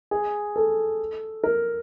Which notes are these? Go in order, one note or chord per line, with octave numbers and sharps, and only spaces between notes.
G#4
A4
A#4